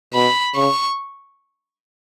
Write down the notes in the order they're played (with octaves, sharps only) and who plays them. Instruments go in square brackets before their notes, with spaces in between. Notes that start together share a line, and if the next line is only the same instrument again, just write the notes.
[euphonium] B2 [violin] B5
[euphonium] C#3 [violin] C#6